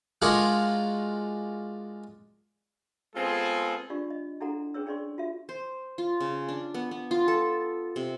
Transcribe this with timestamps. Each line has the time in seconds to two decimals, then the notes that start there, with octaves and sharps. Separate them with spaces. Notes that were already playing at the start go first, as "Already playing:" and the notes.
0.22 G#3 D4 F4 F#4 G#4 A#4
3.16 G#3 B3 C4 F4 G#4 A4
3.90 D4 F4 G4 D5 C#6
4.10 D#5
4.40 D4 E4 F#4 A4 F#5 A#5
4.74 C#4 G#4 B4 C#5 E6
4.86 D4 G#4 C5 D5 C6 C#6
5.18 F4 F#4 E5
5.49 C5
5.98 F4
6.20 C#3
6.49 D4
6.74 B3
6.91 B3
7.11 F4
7.28 A4
7.96 C3